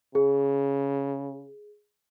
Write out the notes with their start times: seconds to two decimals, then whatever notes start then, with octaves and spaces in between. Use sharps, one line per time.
0.15 C#3 G#4